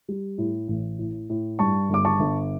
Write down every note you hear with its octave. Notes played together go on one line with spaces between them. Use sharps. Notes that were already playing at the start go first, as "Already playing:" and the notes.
G3
A2
A1
A2
A2
G2 A5 C#6
G1 D6
A5 C#6
G1